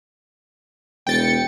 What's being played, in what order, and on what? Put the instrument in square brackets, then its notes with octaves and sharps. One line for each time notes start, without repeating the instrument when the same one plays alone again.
[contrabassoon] E1 [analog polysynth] G5 A6 C#7